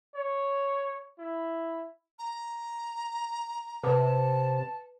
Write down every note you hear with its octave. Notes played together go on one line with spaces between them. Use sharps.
C#5
E4
A#5
C3 B4 A5 D6